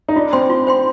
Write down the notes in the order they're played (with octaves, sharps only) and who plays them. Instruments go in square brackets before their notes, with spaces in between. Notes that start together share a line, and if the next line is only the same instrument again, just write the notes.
[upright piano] D#4
[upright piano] D4 [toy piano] F4
[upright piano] C4 [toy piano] C5 G5 C6
[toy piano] F4
C5 G5 C6